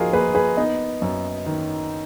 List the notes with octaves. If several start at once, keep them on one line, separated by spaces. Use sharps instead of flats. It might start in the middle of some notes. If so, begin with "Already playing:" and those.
Already playing: F2 F3 D#4 F4 F#4 G#4 A#4
A#3 G#4 B4
G#4 B4
B3 D#4
F#2
D#3